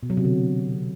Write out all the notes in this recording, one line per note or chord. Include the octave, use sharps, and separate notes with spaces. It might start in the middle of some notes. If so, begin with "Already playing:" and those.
B2
F#3
C3
D3